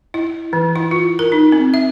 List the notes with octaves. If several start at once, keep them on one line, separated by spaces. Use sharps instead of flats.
E4
E3
E4
F4
A#4
D#4
C4
E5